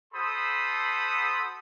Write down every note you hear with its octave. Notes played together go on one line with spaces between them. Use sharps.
F#4 A4 C5 B5 C6 D#6